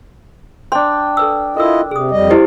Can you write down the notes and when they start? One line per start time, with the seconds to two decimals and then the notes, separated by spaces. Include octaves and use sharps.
0.72 D4 G5 C6
1.17 A4 B4 E6
1.57 E4 F4 A4 A#4 D#5 E6
1.91 C3 G#4 D#6
2.11 F2 G3 D#5
2.30 E4 G4 C5